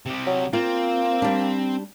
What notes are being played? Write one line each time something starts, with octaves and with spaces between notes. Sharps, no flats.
C3 G3
F#3
A#3 C4 F4
G3 D4